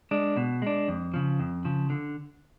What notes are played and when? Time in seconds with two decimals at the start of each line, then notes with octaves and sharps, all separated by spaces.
0.11 G#3 D4
0.37 B2
0.62 G#3 D4
0.88 F2
1.14 C#3 F3
1.40 F2
1.65 C#3 F3
1.90 D3